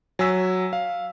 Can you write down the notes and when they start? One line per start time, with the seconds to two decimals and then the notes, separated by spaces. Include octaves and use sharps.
0.19 F#3 G#5 E6 B6
0.73 F5